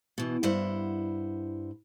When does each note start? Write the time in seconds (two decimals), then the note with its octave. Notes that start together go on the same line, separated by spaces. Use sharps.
0.18 B2 E3
0.43 G2 E4 C5 F#5